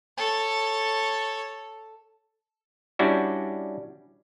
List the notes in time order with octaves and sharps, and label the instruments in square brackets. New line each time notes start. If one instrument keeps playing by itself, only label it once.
[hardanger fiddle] A4 C#5
[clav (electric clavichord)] G3 C#4 D4 E4 F#4